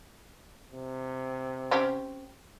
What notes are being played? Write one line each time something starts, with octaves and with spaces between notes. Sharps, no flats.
C3
C4 C#4 G4